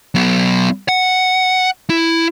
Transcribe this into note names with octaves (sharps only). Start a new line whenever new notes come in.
F#3 B3
F#5
E4